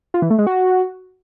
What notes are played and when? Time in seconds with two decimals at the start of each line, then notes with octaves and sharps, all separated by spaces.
0.14 F4
0.22 E3
0.30 A3
0.38 G#3
0.47 F#4